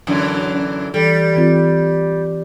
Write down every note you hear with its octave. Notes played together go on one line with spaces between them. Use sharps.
F#2 D3 E3
E3 G3 A4
E3 C4 F4